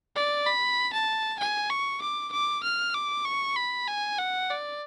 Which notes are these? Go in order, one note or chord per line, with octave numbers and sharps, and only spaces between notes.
D5
B5
A5
G#5
C#6
D6
D6
F6
D6
C#6
B5
G#5
F#5
D5